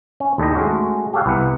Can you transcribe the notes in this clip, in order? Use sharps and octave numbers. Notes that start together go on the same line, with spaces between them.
C#4
D#2 A3 D4 E4 G4 D#5
G#3 A3 C#4 F#4
G4 A4 C#5 F5 F#5
C2 B3 E4 F#5